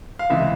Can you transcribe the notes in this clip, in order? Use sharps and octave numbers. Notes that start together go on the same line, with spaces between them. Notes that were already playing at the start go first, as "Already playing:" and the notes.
F5
C#2 C3 E3 E5